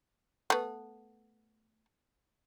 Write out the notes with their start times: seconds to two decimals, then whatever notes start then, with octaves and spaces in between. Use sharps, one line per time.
0.50 A3 B3